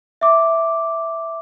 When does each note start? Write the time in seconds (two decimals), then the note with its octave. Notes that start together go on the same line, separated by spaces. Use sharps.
0.21 E5 D6